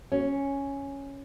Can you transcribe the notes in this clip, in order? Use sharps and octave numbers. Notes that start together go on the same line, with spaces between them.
C#4